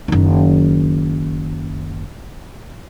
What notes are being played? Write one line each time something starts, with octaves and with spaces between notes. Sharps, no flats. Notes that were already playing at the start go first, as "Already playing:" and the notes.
F#1 D#3